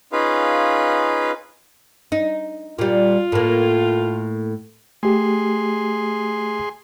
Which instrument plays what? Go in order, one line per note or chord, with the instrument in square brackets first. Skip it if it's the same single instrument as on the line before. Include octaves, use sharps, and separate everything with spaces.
[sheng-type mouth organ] C#4 D#4 F4 G#4 B4 F5
[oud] D#4
[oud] A#2 G3 [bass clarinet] F4
[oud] A2 A#3
[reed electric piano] A3 G4 [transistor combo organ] G#4 C6